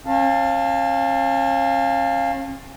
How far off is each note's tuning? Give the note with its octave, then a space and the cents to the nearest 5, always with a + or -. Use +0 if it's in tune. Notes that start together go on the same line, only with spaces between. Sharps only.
C#4 -40 F5 +0 A5 +15